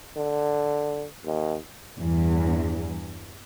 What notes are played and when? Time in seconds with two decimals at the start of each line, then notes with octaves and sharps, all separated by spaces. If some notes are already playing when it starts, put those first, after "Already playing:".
0.16 D3
1.25 D#2
1.99 E2 G2